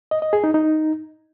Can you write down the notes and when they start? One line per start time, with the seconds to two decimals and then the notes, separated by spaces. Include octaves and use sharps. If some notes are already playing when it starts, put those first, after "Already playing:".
0.11 D#5
0.22 D#5
0.33 G#4
0.44 D#4
0.54 D#4